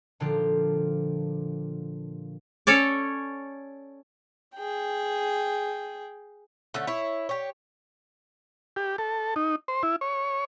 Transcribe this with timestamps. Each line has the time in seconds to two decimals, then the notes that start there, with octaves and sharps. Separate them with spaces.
0.20 A#2 D3 F3 D4 F4 G4
2.67 C#4 A4 C#5 D5
4.56 G#4 G5
6.74 D3 A3 C#4
6.87 E4 C#5
7.29 G4 C#5
8.76 G4
8.98 A4
9.36 D#4
9.68 C5
9.83 E4
10.01 C#5